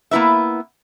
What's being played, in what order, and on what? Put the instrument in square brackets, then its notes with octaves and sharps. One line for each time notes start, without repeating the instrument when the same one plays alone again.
[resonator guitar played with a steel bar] A#3 B3 E4 B4 E5